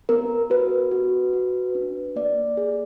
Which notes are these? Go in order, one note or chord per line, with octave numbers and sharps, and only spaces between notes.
B3 A#4
F#4 B4
F#4
F#4
D4
A#3 D5
G#4